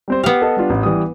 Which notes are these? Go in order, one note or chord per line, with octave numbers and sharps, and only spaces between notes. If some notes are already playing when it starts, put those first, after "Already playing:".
G3 C4 C5
B3 G4 F5
A4 D#5
G3 D4 F4
A1
E3 G3 D#6